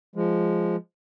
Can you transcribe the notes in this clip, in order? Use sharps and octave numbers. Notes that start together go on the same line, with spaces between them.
F3 G#3